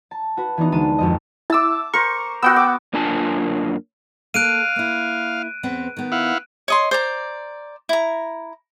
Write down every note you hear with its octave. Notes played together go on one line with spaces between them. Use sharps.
A5
F#4 B4
E3 B3 D4 D#4
D2 G#3 A5 D#7
G#1 F2 D#5
E4 A5 D6 E6
A#4 C5 C#6
B3 F#4 F#5 G5 E6
D6
F#2 A#3 D4 F4 G#5 A5
A#3 A4 F5 F#6 D7 D#7
A#3 E4
E2 B3 C4
D#3 B3
E4 F5 F#5
C#5 D#5 C6
C5 D5 A#5
E4 A#5